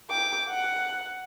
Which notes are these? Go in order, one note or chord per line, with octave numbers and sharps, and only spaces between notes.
G5 D6
F#5